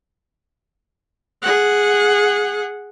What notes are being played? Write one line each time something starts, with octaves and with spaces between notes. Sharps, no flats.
G#4 F#5